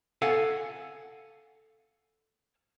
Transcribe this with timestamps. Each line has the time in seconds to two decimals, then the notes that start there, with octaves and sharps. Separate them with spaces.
0.22 A4 F5 F#5 G#5